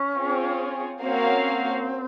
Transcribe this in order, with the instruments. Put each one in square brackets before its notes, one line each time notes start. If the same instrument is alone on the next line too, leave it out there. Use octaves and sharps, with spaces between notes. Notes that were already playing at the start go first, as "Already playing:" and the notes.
Already playing: [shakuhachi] C#4
[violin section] C4 F4 G#4 C#5
[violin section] A#3 C#4 F#4 C#5 F5 [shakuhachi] C4